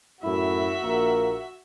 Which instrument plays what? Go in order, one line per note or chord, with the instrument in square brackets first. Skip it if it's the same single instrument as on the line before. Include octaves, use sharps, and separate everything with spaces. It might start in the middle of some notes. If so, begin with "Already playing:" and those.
[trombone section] F#2 A2 E4 [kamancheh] F#4 E5
[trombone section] A#1 A#3 A#4